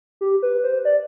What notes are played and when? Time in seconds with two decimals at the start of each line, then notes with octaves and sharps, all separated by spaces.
0.21 G4
0.42 B4
0.64 C5
0.85 D5